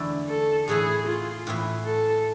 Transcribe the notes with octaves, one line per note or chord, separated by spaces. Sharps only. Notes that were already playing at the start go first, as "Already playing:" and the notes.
Already playing: E2 D3 A3 E4
A4
A2 E3 B3 E4 G#4
F4
A2 E3 B3 E4
A4